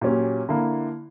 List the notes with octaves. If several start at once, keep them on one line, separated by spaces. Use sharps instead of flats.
A#2 F#3 C#4 G4
D3 A#3 E4